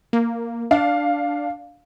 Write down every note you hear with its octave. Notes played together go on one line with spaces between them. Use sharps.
A#3
D4 F5